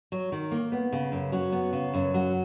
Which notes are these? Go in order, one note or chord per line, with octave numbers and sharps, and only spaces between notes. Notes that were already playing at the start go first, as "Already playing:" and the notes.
F#3
D#3
A#3
B3
C#3
F#2
F#3
B3
C#3
F#2
F#3